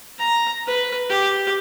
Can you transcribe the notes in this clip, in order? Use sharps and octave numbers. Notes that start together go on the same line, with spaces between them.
A#5
B4
G4